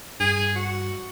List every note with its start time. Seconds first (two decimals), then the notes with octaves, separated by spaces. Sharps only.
0.20 G2 G#4
0.55 F#4